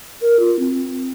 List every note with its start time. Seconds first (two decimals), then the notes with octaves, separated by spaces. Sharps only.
0.22 A#4
0.39 F4
0.59 C4